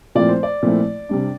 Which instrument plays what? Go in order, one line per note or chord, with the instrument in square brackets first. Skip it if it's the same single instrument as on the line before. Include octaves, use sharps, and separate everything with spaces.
[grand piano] A#2 F3 A3 C4 E4 D5
C5
D5
A#2 F3 A3 C4 E4
C3 G3 D4